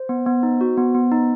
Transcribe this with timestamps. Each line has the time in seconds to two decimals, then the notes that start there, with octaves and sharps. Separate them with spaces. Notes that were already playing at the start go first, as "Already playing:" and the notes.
Already playing: C5
0.09 B3
0.26 B3
0.43 D#4
0.61 F#4
0.77 B3
0.95 B3
1.11 D#4